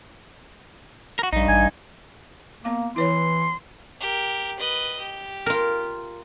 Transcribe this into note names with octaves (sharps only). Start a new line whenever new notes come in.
F#4 A#4
A#1 G2 D#4
A1 G#5
A#3 B3 F5 D6
E3 E4 B4 C#5 C6
G4 A#4
B4 D#5
G4
F4 A#4